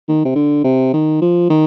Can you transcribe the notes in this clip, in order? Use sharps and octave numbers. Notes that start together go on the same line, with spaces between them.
D#3
C3
D3
C3
D#3
F3
D#3